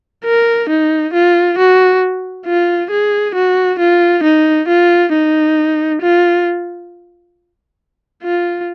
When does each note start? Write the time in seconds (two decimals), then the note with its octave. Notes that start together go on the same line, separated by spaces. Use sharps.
0.25 A#4
0.69 D#4
1.13 F4
1.58 F#4
2.46 F4
2.91 G#4
3.35 F#4
3.80 F4
4.24 D#4
4.68 F4
5.13 D#4
6.02 F4
8.24 F4